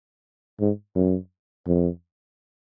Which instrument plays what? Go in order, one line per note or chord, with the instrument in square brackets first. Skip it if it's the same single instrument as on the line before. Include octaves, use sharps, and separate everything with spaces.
[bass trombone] G#2
F#2
F2